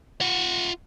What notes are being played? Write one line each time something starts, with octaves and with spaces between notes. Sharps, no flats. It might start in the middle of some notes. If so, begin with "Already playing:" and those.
F4 F#5